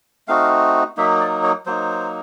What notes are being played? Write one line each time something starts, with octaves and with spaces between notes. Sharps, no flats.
A3 C4 D#4 F#4 F5
F#3 A#3 D#4 E5
D5
C#5
F#3 A#3 D#4 C5